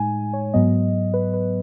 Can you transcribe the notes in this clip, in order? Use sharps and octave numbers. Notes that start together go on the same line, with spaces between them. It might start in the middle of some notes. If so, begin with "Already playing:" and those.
Already playing: A2 G#3 D#4 G#5
C#5
G#2 F#3 B3 D#5
B4
B4